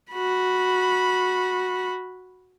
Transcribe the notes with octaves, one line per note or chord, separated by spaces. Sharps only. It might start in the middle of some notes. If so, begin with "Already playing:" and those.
F#4 B5